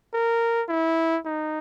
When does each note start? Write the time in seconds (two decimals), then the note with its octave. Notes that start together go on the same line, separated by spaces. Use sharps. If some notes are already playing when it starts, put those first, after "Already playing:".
0.14 A#4
0.69 E4
1.25 D#4